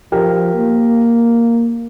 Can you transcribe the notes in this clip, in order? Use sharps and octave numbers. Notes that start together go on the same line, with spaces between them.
F3 G4 A#4
A#3